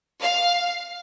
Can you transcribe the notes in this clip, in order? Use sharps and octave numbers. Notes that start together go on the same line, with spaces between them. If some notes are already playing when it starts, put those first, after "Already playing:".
F5